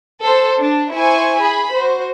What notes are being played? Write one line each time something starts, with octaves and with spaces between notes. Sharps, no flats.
A4 C5
D4
E4 C5 G#5 C#6
G#4 B5
F#4 C5